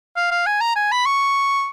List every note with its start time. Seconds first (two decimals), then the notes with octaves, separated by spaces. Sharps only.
0.17 F5
0.31 F5
0.46 G#5
0.61 A#5
0.76 G#5
0.92 B5
1.06 C#6